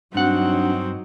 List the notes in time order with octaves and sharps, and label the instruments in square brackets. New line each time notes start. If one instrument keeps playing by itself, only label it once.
[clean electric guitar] G2 F#5 [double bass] F#3 D#4 [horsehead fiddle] C4 F#4 [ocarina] D4